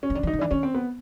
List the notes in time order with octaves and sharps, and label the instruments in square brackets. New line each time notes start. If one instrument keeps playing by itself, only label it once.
[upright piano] C#4
[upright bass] E3
[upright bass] D#3 [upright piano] D4
[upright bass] E3
[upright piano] D#4
[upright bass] D#3
[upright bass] E3 [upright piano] D4
[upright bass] D#3 [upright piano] C#4
[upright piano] C4
B3